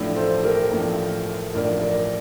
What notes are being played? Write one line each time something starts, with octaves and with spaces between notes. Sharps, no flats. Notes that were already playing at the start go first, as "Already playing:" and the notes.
Already playing: A1 A2 F3 A3 D4
A4 C5
G4 A#4
A1 A2 F3 A3 D4
A1 A2 F3 A3 D4 A#4 D5
A#4 D5